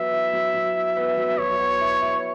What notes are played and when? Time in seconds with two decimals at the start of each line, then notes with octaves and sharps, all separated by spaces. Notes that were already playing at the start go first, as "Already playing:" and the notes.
Already playing: F#3 B3 E5
0.13 E4
0.33 F#3
0.54 F#3
0.76 E4
0.97 B3
1.18 F#3
1.38 F#3 C#5
1.60 B3
1.81 E4
2.02 E4